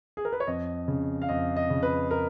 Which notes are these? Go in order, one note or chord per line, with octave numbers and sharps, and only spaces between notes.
G#4
A#4
B4
C#5
F2 D#5
C#3
F5
F2 D#5
D#5
C#3
B4
A#4